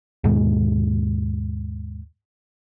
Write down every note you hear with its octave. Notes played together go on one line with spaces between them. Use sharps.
D#2 G#2 B2 G#3